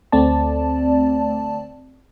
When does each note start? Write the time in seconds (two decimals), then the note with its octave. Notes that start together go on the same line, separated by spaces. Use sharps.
0.12 D2 A3 C4 D5 A5